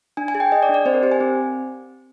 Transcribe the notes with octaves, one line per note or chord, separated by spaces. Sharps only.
D4 G#5
G#5
G#4
G5
G#4 D#5
D5
D4
D5
C4 C5
A#4
G4 C5
G#5
C4